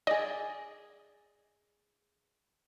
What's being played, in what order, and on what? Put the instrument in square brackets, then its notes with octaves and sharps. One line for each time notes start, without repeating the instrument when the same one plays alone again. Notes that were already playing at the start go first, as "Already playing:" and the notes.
[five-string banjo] G#4 D5 [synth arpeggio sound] D#5